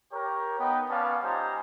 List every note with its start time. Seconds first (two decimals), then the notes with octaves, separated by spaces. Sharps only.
0.12 G4 A#4 C#5
0.59 B3 D#4 G5
0.90 B3 C#4 D5 F5 A5
1.23 G3 D#4 F4 C5 G#5 A#5